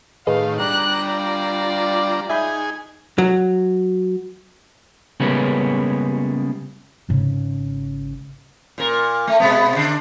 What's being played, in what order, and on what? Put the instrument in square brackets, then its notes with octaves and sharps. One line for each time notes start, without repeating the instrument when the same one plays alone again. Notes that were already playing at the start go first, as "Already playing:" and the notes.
[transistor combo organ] A2 D#3 [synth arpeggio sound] G#4 B4 D#5 [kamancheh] F5
[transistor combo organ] G3 D4 A#5 [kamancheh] F#6
[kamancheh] F4 D5
[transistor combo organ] D#4 G#4 G#5 [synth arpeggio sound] E5 B5 G6
[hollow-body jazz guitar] F#3
[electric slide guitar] C#3 G3 G#3 A#3 B3 C#4
[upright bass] G#1 C#3
[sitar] A#2 A#4
A3
B2 G#3 B3
D3 D4